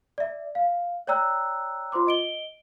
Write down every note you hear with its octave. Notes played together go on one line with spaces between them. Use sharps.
D5 E5
F5
C#5 D5 G5 A#5 E6 F#6
F4 C5 C6 D6
D#5 D7 G7